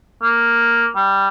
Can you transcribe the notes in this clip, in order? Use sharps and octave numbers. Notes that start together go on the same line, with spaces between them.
A#3
G3